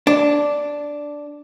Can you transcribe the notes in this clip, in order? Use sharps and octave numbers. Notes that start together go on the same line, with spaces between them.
D4